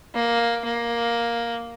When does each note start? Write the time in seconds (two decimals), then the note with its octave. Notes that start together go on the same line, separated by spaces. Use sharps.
0.15 A#3
0.65 A#3